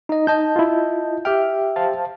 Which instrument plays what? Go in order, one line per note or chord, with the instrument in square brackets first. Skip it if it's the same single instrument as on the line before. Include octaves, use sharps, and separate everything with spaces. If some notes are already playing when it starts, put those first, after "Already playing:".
[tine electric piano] D#4 D#5
[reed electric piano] D#4 [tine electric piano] D#5 A5 G6
[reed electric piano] E4 F4
[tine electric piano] G4 E5 G5 [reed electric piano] F6
[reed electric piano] C5 F5 A5